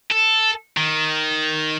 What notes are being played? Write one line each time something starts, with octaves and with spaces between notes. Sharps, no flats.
A4
D#3